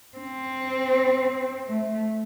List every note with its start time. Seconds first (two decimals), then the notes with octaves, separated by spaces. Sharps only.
0.18 C4
1.68 A3